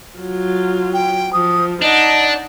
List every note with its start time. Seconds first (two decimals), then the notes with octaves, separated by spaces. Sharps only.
0.17 F#3 F4
0.94 G5
1.33 F3 D#6
1.82 D4 D#4 D#5 F#5